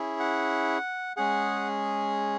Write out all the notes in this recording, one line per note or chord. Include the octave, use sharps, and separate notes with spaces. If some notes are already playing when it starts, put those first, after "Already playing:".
Already playing: C#4 E4 G#4
F#5
G#3 C#4 G#4 F#5